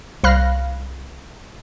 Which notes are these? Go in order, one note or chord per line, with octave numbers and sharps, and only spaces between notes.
C2 F5 B5 F6 F#6 A#6